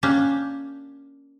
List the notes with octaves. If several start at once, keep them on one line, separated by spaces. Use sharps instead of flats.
A#3 C#4 D4 G4